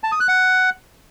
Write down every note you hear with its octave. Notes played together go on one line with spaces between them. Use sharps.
A5
D#6
F#6
F#5